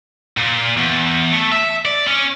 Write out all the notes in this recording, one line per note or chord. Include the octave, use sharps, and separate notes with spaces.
A#2
E2
A3
E5
D5
C#4